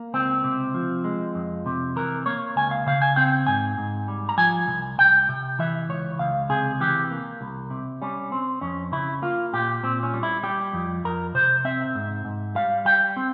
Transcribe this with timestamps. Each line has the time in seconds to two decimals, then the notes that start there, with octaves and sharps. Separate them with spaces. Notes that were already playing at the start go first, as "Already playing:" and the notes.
Already playing: A#3
0.14 C#2 C4
0.44 C3
0.74 F3
1.04 G#3
1.35 F2
1.66 C3
1.96 E3 A#4
2.26 A#3 C#5
2.56 C#2 G#5
2.71 F5
2.87 C#3 F5
3.02 G#5
3.16 C4 G5
3.47 G#2 G#5
3.78 G#2
4.08 G3
4.29 A#5
4.37 F3 G#5
4.68 C2
4.98 C2 G5
5.29 C3
5.59 E3 E5
5.89 C#2 C#5
6.19 C#2 F5
6.49 C3 G#4
6.80 E3 G4
7.11 A#3
7.41 C2
7.70 C3
8.02 G3 C#4
8.32 C4
8.61 F2 C#4
8.92 C#3 E4
9.22 A#3 F4
9.53 A#2 G4
9.83 A#2 C4
10.03 C#4
10.14 G3
10.23 E4
10.43 G3 G4
10.73 F2
11.04 F2 A#4
11.35 C3 C5
11.65 C4 E5
11.95 G#2
12.25 G#2
12.55 G3 F5
12.85 G3 G5
13.17 C4